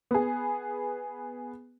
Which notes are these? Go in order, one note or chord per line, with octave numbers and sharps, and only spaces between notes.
B3 G#4